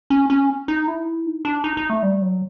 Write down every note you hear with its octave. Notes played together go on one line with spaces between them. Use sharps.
C#4
C#4
D#4
E4
D#4
D4
D#4
D#4
A3
G3
F#3